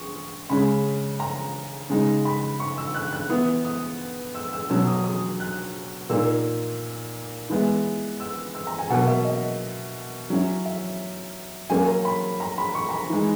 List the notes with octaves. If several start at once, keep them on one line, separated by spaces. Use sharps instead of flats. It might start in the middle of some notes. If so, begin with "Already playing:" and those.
Already playing: C#6 D#6
C#3 G#3 C#4 B5
A#5
C#3 G#3 D#4
B5
C#6
E6
F#6
F#6
E3 B3 E4 D#6
D#6
E6
E6
B2 F#3 C#4 E6
D#6
D#6
F#6
A#2 A#3 D#4 E6
E3 G#3 B3 E4
E6
E6
A#5
G#5
B2 F#3 A#3 F#5
E5
D#5
F#3 C#4 E4
E5
F#3 A#3 C#4 G#5
A#5
B5
A#5
B5
C#6
A#5
B5
E3 G#3 D#4